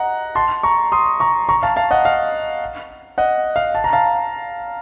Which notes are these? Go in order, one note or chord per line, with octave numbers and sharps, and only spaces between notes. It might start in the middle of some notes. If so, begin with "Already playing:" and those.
Already playing: D#5 F#5 A#5
A5 C6
A#5 C#6
C6 D#6
A#5 C#6
A#5 C#6
F5 A5
F5 A5
D#5 F#5
F5
D#5 F#5
F5
A5
A#5
F5 A5